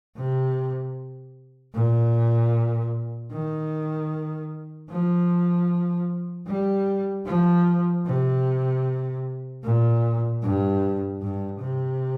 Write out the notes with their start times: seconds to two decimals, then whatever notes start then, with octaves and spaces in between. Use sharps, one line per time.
0.17 C3
1.74 A#2
3.32 D#3
4.90 F3
6.47 G3
7.26 F3
8.06 C3
9.64 A#2
10.43 G2
11.22 G2
11.61 C3